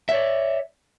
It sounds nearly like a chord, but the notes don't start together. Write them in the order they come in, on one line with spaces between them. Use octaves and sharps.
E5 C#5 D5